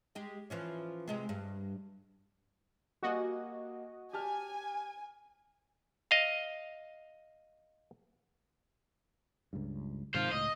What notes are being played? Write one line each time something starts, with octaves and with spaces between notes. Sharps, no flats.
G#3 G4
E3 F3 C#4
C3 G#3 C4
G2
G3 A#3 F#4 D#5 G#5
G4 G#5 A5 F6
D#5 F5
C#2 G2
G#2 C3 D#3 C5 F5
C#2 A2 D#5